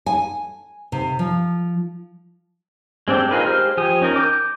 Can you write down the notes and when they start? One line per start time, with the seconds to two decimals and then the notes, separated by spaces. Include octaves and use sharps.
0.06 G#5
0.92 C3
1.19 F3
3.08 G#3 C4 D4 G4 A4
3.31 D#4 F4 G#4 A#4 B4
3.46 G#3 G4 C5 F6
3.77 F3 G4 G#5 D#6
4.01 C#4 D#4 A#4 A#5
4.16 D6 D#6 G6